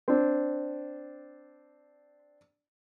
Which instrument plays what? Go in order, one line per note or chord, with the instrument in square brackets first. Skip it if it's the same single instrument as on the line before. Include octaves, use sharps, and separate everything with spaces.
[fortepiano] C4 D4